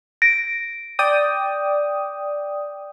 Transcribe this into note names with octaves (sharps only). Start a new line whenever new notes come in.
A#6 D7
D5 G5 D#6